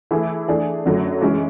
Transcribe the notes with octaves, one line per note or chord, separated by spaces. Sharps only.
E3 A3 E4 G#4
E3 A3 D4 G#4
F#2 D3 F#3 A3
E3 G#3 C#4